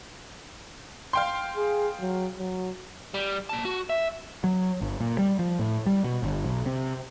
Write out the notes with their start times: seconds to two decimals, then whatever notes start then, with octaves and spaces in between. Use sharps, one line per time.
1.13 F5 G5 C6
1.57 G#4
2.01 F#3
2.39 F#3
3.14 G3
3.49 A#3 A5
3.65 F#4
3.90 E5
4.44 F#3
4.81 G1
5.01 A#2
5.18 G3
5.39 F3
5.59 A2
5.86 G3
6.04 B2
6.23 G1
6.44 B1
6.66 C3